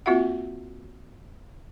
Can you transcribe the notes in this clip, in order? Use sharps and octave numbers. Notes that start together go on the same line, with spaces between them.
A#3 C4 F4 F#4 E5 F#5